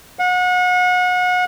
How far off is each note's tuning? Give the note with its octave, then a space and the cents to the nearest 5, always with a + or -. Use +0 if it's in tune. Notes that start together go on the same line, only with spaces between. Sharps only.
F#5 -35